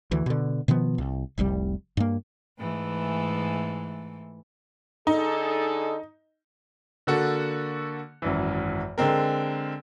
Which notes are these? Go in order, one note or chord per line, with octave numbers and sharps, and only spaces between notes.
D2 E3
B2 D3
B2 D#3 F3 B3
C2
F1 C2 C3 G3
G2 A#3
G#2 E3 A3
D3 D#4 G#4 A4
D3 A#3 F#4 A4
G#1 F#2 E3
D3 G#3 C4 A#4